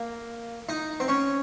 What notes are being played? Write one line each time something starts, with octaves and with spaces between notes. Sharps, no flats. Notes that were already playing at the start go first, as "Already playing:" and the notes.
Already playing: A#3
D#4
C4
C#4